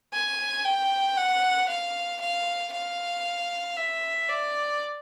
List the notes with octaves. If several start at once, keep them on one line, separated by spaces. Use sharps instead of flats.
G#5
G5
F#5
F5
F5
F5
E5
D5